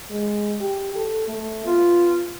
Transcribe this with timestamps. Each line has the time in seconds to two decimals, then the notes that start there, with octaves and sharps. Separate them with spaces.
0.11 G#3
0.61 G4
0.96 A4
1.28 A3
1.65 B3 F4